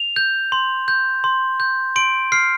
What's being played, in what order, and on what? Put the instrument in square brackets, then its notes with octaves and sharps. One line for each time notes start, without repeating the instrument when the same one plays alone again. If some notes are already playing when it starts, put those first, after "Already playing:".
Already playing: [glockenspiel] F7
G6
C6
G6
C6
G6
C6 D7
F6 C7